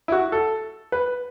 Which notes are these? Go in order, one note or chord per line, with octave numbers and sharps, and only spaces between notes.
E4
F#4
A4
B4